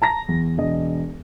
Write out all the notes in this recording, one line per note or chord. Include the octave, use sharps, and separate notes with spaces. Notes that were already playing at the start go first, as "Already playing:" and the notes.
A5 A#5 A#6
E2
E1 D#5